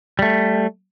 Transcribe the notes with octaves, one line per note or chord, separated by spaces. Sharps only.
G3 A3